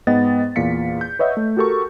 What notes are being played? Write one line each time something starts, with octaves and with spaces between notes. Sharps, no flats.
G#2 B3 D#5 G5 A6
E2 A#2 F5 B6 C#7
G6
B4 C#5 D#5 E5 F#5
A3
F#4 G4 A4 A#4 C#6